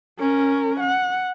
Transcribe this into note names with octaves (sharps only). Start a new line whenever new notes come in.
C#4 A#4
F#5